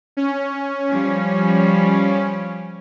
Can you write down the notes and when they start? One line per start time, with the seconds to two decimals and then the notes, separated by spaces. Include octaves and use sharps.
0.17 C#4
0.90 F3 G3